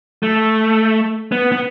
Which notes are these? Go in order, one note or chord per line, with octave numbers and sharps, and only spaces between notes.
A3
B3
B3